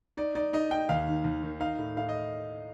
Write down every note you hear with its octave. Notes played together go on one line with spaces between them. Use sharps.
D#4 D5
D#4 D5
D#4 D#5
D#4 G5
D#2 F5
D#3
D#2
D#3
D#4 F5
A2
A2 F5
D#5